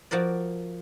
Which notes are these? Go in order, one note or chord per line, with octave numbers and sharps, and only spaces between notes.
F3 F#4 A#4 D5